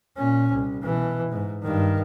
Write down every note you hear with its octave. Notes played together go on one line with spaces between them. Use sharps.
A#2 C#4
C2
B2 E3
G#2
G2 D#3